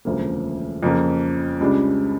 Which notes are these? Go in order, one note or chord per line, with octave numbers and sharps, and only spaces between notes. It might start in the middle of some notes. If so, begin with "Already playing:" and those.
E1 D2 C#3 F3 A#3
F2 C#3 F3 A#3
C#2 C#3 G3 D4